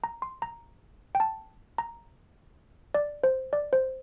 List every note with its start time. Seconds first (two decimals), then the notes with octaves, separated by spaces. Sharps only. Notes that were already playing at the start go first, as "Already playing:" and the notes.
0.04 A#5
0.22 C6
0.42 A#5
1.15 G5
1.20 A5
1.78 A#5
2.94 D5
3.23 C5
3.53 D5
3.73 C5